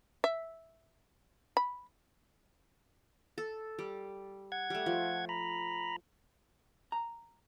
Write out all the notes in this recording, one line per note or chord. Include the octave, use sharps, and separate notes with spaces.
E5
B5
A4
G3
F#5 G#6
G3 A3
F3
A#5 B5
A#5